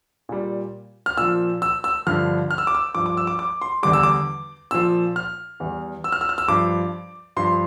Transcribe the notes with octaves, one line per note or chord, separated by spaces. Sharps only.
A#2 G3
F6
A#2 F3 E6
E6
E6
G2 D3 F3 F6
F6
E6
D6
E6
G2 F3 D6
D6
E6
D6
D6
C6
E2 D3 G3 D6
E6
D6
A#2 F3 E6
F6
E2 E3 G3
E6
F6
E6
F6
E6
G2 F3 D6
G2 F3 C6